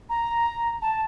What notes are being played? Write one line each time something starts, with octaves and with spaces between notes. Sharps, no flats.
A#5
A5